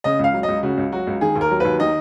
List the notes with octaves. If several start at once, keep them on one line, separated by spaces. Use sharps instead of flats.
C#3 D#5
C#2 F5
F#3
C#2 D#5
C#3 F#4
C#2
F#3 F#4
C#2
D#3 G#4
D#2
A#4
F#3
D#2 B4
D#3 D#5